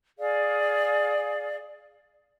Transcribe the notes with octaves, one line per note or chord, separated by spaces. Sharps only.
G#4 D5 F5